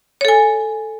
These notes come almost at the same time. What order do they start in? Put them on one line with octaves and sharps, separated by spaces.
C#5 A4 G#5